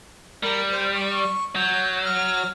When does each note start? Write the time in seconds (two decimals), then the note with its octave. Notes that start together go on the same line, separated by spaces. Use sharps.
0.43 G3 A#4
0.71 C5
0.94 C#6
1.55 F#3 G6
2.05 F6